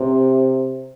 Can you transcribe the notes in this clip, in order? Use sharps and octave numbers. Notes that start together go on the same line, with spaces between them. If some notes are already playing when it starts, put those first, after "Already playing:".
Already playing: C3